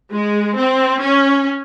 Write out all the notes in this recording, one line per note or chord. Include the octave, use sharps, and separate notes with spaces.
G#3
C4
C#4